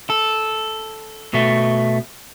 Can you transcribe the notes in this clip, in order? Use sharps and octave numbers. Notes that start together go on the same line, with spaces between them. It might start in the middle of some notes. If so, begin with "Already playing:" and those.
A4
B2 A3